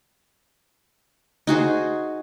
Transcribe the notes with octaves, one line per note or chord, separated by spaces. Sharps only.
D#4 F#4 G#4 C5